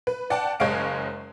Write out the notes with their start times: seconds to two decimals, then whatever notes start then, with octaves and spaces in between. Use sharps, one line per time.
0.07 B4
0.30 D5 F#5 G5 A5
0.60 F#1 G#3 C#5 F5 D7